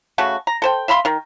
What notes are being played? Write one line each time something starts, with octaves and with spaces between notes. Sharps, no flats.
C#3 A3 F#4
A#5
A4 C5 G5
E5 F5 B5 C6
D#3 A#4